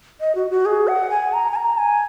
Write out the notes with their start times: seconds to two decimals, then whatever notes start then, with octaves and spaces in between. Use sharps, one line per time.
0.21 D#5
0.35 F#4
0.50 F#4
0.66 G#4
0.88 F#5
1.10 G#5
1.33 A#5
1.51 G#5
1.56 A#5
1.78 G#5